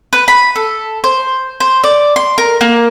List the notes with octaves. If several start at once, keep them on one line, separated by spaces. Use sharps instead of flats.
B4
B5
A4
C5
C5
D5
C6
A#4
A#3